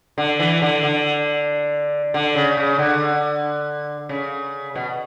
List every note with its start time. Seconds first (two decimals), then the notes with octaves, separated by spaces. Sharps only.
0.18 D3
0.40 E3
0.62 D3
0.83 D3
2.14 D3
2.35 C#3
2.57 C#3
2.79 D3
4.09 C#3
4.75 B2